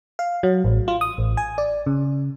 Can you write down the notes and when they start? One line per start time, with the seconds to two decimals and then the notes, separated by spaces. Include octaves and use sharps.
0.19 F5
0.43 F#3
0.64 A1
0.88 F4
1.01 D#6
1.18 A1
1.37 G#5
1.58 D5
1.86 C#3